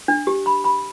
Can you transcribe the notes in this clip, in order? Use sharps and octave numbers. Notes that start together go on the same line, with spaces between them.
D4
G4
B5
B5